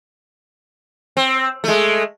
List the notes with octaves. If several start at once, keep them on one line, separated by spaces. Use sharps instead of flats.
C4
G#3 A3